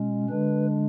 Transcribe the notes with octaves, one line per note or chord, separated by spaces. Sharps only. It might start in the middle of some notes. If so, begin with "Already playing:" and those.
Already playing: B2 G#3 C#4
D3 G#3 D4 B4